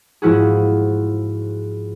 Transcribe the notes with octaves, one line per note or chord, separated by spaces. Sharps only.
G#2 F3 E4 F#4 G#4